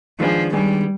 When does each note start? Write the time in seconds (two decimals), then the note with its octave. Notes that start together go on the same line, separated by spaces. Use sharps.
0.19 D#3 F3 G#3 B3 D4 G#4
0.52 D#3 G3 G#3 B3 D4 G#4